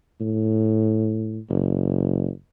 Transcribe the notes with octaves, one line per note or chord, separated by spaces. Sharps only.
A2
F#1